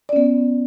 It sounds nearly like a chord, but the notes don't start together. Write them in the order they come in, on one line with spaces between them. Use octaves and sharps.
D5 C#4 B3